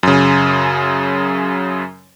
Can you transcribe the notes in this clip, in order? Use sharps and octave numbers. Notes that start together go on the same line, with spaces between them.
F#2 C#3